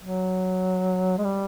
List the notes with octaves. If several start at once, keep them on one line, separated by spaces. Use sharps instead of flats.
F#3
G#3
G3